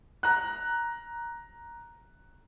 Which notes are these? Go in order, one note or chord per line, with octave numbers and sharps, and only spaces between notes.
A#5 F#6